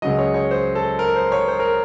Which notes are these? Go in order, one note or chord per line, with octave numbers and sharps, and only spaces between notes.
C#2 C#3 F#3 D#5
C#5
C#5
C5
A4
A#4
C5
C#5
C5
A#4